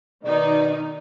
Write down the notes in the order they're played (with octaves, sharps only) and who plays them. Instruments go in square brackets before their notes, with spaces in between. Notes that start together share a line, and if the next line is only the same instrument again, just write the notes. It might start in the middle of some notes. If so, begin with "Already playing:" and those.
[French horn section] B2 D5 [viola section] D#3 D#4